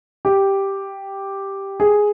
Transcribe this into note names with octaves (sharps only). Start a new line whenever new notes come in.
G4
G#4